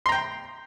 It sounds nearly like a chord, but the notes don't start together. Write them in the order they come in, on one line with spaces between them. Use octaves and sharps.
C6 A#5 G5